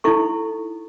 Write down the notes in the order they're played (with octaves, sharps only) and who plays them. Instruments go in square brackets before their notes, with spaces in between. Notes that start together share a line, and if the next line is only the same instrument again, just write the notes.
[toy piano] D#4 E4 A4 C#6